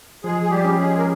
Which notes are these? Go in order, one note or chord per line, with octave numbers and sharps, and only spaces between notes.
F3 G#3 G#4
G#4
G3 G4
C#4
G#3 G#4
A#4